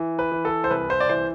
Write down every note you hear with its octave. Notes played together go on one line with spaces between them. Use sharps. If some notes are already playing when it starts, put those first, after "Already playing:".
Already playing: E3
B4
E3
A4
C5
C2 B4
C5
D5
E3 C5